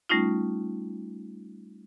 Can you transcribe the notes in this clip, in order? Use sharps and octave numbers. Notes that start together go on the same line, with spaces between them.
G3 A3 C#4 D#4 F4